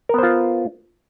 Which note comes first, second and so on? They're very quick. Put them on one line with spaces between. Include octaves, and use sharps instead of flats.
A#4 B3 C5 F4